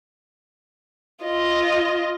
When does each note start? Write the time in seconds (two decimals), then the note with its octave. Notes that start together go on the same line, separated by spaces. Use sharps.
1.23 F4 D#5